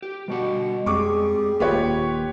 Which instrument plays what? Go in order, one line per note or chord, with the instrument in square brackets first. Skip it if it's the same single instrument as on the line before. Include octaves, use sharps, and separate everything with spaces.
[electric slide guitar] G4
[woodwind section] B2 [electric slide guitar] G3 B3 F#5
[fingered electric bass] F2 C4 [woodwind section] G3 G#4 [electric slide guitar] G#3 [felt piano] C#6 D6
[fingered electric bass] D#1 D#2 A#3 [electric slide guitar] F4 [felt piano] G4 B4 C#5